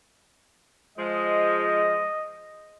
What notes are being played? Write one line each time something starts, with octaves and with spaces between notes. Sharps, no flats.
F3 G#3 D#5